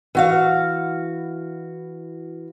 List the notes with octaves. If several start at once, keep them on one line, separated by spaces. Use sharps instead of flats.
E3 F#4 F5